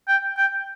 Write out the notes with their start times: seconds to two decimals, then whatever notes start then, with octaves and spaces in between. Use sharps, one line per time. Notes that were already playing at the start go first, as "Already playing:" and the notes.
0.08 G5
0.37 G5